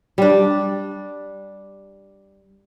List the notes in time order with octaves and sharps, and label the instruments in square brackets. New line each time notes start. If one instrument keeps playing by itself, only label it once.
[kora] G3 D4